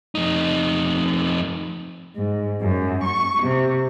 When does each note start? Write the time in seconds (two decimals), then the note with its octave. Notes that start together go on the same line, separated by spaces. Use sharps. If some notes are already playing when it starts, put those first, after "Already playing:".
0.15 F2 D#4
2.17 G#2
2.61 F#2
3.03 C#6
3.42 C3